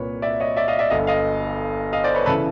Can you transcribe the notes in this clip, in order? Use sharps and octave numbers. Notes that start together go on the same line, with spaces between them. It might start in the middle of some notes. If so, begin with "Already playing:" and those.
Already playing: C2 A#2 B4 C#5
D5 E5
C#5 D#5
D5 E5
D#5 F5
D5 E5
G1 G2 D3 D#5 F5
D#5 F5
D#5 F5
C5 D5
B4 C#5
C#3 E3 A4 B4